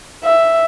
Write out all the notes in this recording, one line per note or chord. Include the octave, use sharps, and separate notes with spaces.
E5